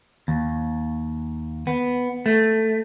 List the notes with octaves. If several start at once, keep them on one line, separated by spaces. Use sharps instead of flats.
D#2
B3
A3